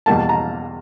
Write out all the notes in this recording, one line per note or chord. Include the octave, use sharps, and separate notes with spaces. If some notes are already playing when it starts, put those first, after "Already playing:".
E2 B2 G3 A#3 A5
A#5